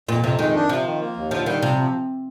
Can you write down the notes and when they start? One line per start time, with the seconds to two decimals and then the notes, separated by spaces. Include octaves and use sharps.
0.08 F2 A#2
0.24 F2 C3
0.39 D#3 G#3
0.55 D4
0.69 C3 F3
0.85 D#3
1.00 A#3
1.16 D#2
1.31 D3 F3
1.46 D#3 G3
1.62 C3 F3
1.78 F3